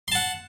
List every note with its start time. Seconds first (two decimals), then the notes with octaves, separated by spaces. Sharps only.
0.08 C6
0.12 A5
0.15 F#5